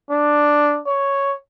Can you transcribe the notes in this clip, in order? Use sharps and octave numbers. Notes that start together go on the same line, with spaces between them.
D4
C#5